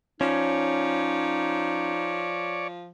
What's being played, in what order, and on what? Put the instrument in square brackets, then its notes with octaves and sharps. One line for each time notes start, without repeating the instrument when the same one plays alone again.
[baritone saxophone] F3 [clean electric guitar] C#4 [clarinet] D#4 [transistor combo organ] C#5 D5